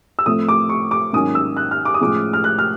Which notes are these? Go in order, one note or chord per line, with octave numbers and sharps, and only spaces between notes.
E6
A2 F3 A3 C4 D#6
D6
C#6
D6
G#2 D#3 F#3 A#3 C#4 D#6
E6
F#6
F6
D6
D#6
A2 F3 G#3 C#4 D6
F6
F#6
F6